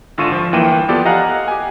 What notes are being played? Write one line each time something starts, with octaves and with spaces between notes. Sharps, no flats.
G#1 D3 F4 C#6 D#7 E7
F3
G1 E3 A#3 G5 D#7 E7
F3 B3 F4 G4 A4 D5
D#5 F5 F#5 G#5 A#5 F#6
G4 G#5